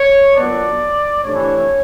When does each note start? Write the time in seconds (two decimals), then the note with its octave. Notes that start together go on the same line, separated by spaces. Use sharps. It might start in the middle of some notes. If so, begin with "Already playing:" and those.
Already playing: C#5
0.35 A#2 F#3 B3 D4 D5
1.24 C3 E3 A3 D4 C#5